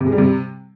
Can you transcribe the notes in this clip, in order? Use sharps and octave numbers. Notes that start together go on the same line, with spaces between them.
C3
G#3
G3
C3